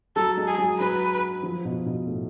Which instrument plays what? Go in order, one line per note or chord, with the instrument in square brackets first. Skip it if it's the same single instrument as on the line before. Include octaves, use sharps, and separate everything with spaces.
[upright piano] F#3 [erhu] A4
[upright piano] G#3
[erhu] G#4
[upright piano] F#3
[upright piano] F#3 [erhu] B4
[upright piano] F3
B2
B2
A2